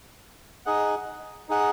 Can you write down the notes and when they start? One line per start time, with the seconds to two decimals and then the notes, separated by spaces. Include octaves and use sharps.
0.66 D#4 G#4 D#5 F#5
1.49 D#4 G#4 D#5 F#5